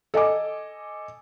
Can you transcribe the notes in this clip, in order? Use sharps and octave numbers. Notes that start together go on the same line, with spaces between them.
A4 D#5 G#5 D6